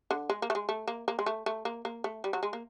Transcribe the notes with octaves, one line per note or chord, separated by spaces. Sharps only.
D3
G#3
A#3
A3
G#3
A3
A#3
A#3
G#3
A3
A3
A#3
A#3
A3
G3
F#3
G#3
A#3